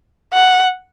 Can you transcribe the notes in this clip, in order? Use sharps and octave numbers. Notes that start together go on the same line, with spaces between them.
F#5